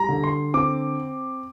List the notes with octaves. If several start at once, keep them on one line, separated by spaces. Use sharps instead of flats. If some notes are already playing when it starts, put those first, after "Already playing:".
Already playing: G3 A#5
D3
C6
C4 D6